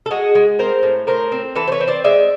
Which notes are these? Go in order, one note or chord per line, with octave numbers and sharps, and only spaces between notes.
A4
G#3 F#4 G#4
G#3
C4 A#4 C5
A2
A2 A#4 C5
C4
E3 A4 B4
C5
B4 C#5
C4
C5 D5
G#3 D5 E5